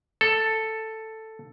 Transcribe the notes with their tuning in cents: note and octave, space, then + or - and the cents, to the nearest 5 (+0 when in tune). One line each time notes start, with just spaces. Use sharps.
A4 +5